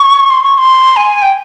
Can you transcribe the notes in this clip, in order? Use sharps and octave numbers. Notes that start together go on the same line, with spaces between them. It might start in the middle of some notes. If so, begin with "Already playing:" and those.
Already playing: C#6
C6
C#6
C6
G#5
G5